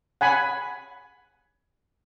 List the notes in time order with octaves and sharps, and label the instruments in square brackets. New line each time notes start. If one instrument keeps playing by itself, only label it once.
[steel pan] F#5 G#5 B5